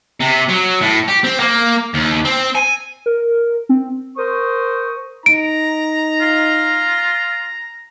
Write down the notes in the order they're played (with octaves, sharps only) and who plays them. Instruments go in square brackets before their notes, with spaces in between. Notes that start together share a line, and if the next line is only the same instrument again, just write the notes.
[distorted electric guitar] C3
F#3
A2
G4
C4
A#3
D#2
C4
G#5
[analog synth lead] A#4
C4
[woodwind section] A#4 C5 C#6 D#6
[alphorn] D#4 [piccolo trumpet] A#5 [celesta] D7
[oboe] F4